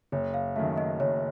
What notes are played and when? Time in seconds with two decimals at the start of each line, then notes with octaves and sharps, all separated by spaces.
0.12 F#1 C#5
0.34 F5
0.56 F#2 D#3 F#3 A3 E5
0.78 D#5
1.00 F#1 C#5